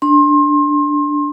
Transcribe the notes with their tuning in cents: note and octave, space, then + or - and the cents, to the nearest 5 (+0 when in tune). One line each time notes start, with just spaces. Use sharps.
D4 +0 C6 +30